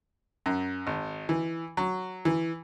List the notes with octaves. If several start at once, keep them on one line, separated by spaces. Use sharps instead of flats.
F#2
G#1
E3
F#3
E3